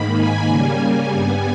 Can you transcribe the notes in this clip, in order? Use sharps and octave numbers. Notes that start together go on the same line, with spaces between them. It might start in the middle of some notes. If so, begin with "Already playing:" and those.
Already playing: G#2 D#3 A#3 B5
G#5
C#3 G3 A#3
G#5
G2 G3 B3